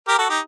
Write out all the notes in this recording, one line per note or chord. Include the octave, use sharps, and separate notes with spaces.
G4 A#4
F#4 A4
D#4 G4